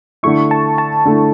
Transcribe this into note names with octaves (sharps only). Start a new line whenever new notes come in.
D3 A3 E4 C#6
A5
A5
D3 A3 E4